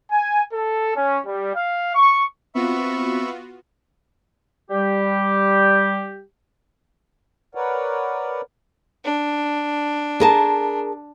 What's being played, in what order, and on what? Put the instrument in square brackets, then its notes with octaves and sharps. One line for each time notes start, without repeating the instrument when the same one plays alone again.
[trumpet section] G#5
A4
C#4
G3
F5
C#6
[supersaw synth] B3 F4 F#4 [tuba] C4 [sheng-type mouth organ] E5 B5 C#6
[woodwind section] G3 G4
[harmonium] A#4 B4 C#5 D5 F#5
[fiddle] D4
[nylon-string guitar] G#4 A#4 A5